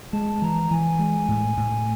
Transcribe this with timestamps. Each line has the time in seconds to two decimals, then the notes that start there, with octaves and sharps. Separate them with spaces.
0.13 G#3 A5
0.42 E3 A#5
0.71 E3 G#5
0.99 G#3
1.29 A2
1.57 A2